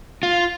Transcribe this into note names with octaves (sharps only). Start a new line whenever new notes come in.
F4